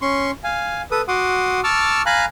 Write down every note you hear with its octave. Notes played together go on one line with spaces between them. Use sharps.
C#4 C6 C#6
F5 G#5
A4 B4 D#6
F#4 F#5 C6 D6 D#6
A5 C#6 D6 E6 F6
F5 G#5 A#5 B5 F#6